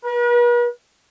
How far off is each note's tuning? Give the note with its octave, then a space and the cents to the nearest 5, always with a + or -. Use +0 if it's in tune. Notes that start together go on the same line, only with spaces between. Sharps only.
B4 -45